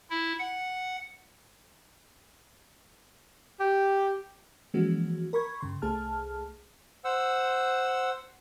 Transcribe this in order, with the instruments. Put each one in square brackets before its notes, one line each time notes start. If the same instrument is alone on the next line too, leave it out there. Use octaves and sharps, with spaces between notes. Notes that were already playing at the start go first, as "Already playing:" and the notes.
[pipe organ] E4
F#5
[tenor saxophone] G4
[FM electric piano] E3 F3 G#3 A#3 C#4 F#4
A#4 B5 C#6 G#6
G2 C#3 C6
C2 A3 G#4 A5 F6
[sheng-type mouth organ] C5 F#5 E6